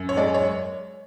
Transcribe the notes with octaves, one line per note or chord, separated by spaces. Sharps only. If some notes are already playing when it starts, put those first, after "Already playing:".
Already playing: F#2
C#5
G#3 D5
C#5